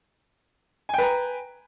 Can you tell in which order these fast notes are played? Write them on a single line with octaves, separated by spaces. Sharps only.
G#5 G5 B4 A#5